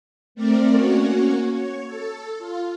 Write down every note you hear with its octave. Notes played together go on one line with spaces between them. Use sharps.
A3 C4 A#4 D5
A#3 C#4 F#4 C#5
C#5
A4
F4